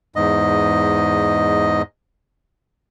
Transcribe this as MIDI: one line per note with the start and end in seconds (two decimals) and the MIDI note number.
0.16 1.82 40
0.16 1.82 44
0.16 1.82 75